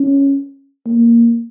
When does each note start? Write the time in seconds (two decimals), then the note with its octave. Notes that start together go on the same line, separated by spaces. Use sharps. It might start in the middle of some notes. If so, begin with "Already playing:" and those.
Already playing: C#4
0.86 A#3